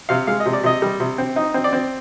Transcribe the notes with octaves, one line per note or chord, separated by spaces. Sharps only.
C3 F5
G#3 F5
D#5
C3
D5
C3 D#5
G3
C3
C4
D#4
C4
D5
C4